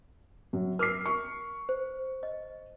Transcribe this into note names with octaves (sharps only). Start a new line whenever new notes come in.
F#2
A#4 D6 F6 C7
C#6
C5
D#5